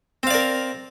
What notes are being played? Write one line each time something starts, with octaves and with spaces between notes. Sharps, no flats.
C4 A#4 D5 F5